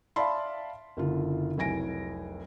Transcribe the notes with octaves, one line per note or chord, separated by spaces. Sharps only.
D5 E5 F5 A5 B5 C6
F#1 D3 F4
F1 C2 F#3 G#5 A#6 D7